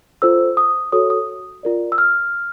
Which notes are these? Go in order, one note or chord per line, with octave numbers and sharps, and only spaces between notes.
F4 A4 C5 E6
D#6
F#4 A4 C#5 D#6
D#6
F4 A#4 D5
E6
F6